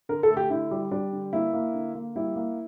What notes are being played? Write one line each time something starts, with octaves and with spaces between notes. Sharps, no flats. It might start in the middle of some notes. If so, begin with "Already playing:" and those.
D3 A#4
A4
A3
G4
D3 E4
G3
G3 D4
D3
A#3 E4
A#3
D3
A#3
G3 E4
A#3